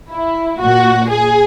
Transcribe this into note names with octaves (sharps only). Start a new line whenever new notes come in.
E4
A#2 F#4
G#4